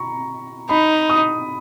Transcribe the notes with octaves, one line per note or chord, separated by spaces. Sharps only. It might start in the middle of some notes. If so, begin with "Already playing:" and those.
Already playing: A#5 B5 C#6
D#4 B5
D#6